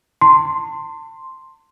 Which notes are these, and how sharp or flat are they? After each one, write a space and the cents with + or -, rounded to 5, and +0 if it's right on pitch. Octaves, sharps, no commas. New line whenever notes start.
A5 +35 C6 +0